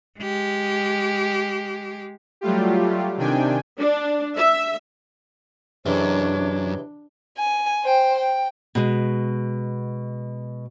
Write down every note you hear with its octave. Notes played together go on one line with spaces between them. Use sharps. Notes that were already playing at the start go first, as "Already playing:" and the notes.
G#3 G4
F#3 G3 A3 F4 G4
C3 D#3 D4 G5 G#5
D4
E5
F#2 C3 E3 G#3 D4 C#5
G#5
C5 G5
G5
B2 G#3